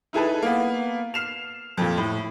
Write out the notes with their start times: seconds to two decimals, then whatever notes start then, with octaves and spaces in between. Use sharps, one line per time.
0.13 D#4 E4 G#4 A4 B4
0.42 A#3 B3
1.14 F6 C7 E7 F7
1.77 F2 A#2
1.97 A2